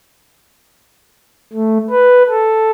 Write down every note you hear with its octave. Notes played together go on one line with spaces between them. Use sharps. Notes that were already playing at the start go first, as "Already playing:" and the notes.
A3
B4
A4